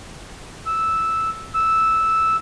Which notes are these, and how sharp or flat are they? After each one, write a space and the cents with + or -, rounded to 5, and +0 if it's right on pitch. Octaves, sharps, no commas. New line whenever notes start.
E6 -5
E6 -5